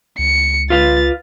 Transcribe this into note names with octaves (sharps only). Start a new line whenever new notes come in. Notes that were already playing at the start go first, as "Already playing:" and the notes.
C#2 C#7
F4 B4 F5 A6